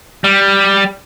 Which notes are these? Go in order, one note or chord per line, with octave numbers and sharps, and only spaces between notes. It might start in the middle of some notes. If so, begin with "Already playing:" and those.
G3